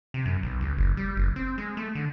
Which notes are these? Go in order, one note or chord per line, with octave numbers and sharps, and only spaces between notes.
C3
F#2
B1
C#2
F#1
G3
F#1
C4
G#3
A3
D3